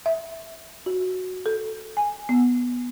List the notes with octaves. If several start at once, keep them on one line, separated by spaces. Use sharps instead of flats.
E5
F#4
A4
G#5
B3